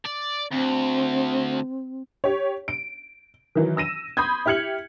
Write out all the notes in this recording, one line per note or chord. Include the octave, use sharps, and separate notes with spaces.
D5
D2 C4
G4 C#5
D7
D#3 E3 F#3
E6 A#6 D#7 E7
B5 C6 D#6 G6 G#6
E4 G4 F6 G#6 C#7 F#7